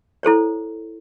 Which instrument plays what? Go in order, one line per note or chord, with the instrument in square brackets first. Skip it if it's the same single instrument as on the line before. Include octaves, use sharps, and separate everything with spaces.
[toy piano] E4 A4 C5 C#5